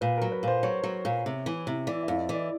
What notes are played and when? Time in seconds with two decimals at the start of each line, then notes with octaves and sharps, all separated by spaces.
0.01 A#2 B4
0.18 F#3 A#4
0.32 B4
0.43 A#2 C5
0.63 F#3 C#5
0.84 F#3
1.05 A#2
1.26 C3
1.46 E3
1.67 C3
1.87 E3 D5
2.03 E5
2.08 F2
2.18 D#5
2.29 E3 D5